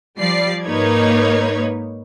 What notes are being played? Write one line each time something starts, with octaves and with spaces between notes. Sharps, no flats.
F3 G3 D5 C7
G#2 A#3 D#4 B4 C#5 G#6